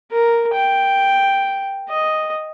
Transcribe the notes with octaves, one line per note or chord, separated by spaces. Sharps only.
A#4
G5
D#5